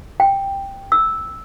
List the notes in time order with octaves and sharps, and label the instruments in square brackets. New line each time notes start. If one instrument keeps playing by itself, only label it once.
[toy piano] G5
E6